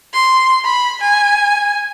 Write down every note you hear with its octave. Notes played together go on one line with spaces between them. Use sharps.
C6
B5
G#5